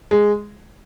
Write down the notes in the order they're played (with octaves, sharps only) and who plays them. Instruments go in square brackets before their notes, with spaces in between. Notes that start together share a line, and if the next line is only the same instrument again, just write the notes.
[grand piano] G#3